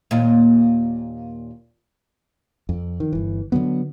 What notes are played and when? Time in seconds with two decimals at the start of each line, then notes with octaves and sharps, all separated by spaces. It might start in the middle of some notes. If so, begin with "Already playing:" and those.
0.11 D#2 A#2
2.69 F2
3.00 D#3
3.13 G1 E3
3.52 D3 E3 F#3 B3